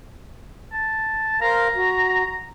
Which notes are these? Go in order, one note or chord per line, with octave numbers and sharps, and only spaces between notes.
A5
A#4 C5 F5 A#5
F#4